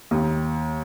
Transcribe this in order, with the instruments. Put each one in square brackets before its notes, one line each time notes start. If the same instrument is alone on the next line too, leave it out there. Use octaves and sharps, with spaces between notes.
[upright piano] D#2